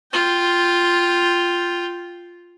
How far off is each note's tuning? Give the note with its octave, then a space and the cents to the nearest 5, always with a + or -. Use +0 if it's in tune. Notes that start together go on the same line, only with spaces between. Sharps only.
F4 +0 G5 +0